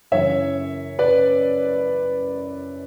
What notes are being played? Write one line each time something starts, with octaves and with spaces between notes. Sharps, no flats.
F#2 C#3 E3 C#5 E5
B4 D5